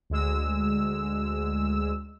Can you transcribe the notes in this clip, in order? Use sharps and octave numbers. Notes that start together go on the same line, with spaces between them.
D2 G#3 E6